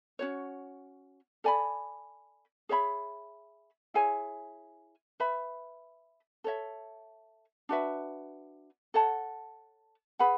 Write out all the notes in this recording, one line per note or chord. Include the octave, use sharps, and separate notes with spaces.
C#4 F#4 C#5
A4 D5 G#5 B5
G#4 C#5 E5 B5
E4 G#4 C#5 G#5
B4 E5 B5
A4 C#5 E5
D4 F#4 B4 E5
A4 C#5 F#5 A5
G#4 B4 F#5 B5